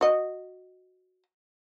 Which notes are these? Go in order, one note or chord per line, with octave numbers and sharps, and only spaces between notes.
F#4 D#5